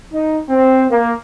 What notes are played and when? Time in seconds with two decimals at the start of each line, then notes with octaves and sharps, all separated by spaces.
0.12 D#4
0.49 C4
0.90 A#3